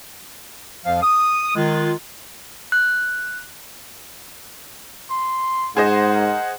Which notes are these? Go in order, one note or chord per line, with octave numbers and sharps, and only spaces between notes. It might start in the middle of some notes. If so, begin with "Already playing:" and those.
F2 F3 F5
D#6
D#3 G#3 F4
F#6
C6
G#2 G#4 C5 D#5 F#5 C6
A#4